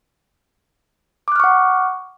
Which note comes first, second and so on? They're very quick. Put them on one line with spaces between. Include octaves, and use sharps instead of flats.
D6 F#6 F6 C#6 F#5